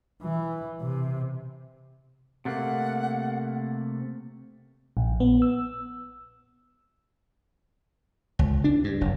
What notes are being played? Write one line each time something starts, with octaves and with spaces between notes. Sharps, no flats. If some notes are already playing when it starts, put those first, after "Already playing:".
E3
C3
C3 A3 A#3 F#5
A#1
B3
E6
C#2
D4
G2
F#1